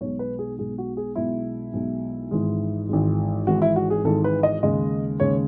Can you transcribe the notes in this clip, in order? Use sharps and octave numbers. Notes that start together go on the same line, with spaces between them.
B1 B2 G#3 C#5
B4
G#4
B1 B2 G#3 G#4
F#4
G#4
B1 B2 G#3 E4
B1 B2 G#3
G#1 G#2 E3 G#3
G#1 G#2 E3 G#3
G#1 G#2 E3 G#3 F#4
E4
F#4
G#4
G#1 G#2 E3 G#3 A4
B4
D#5
D#2 C#3 G#3 D#5
D#2 C#3 G#3 C#5